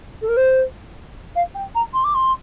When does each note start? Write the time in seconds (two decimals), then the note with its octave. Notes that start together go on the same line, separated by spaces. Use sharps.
0.21 A4
0.28 A#4
0.36 C5
1.35 F5
1.54 G5
1.75 A#5
1.93 C6
2.04 D6
2.14 C6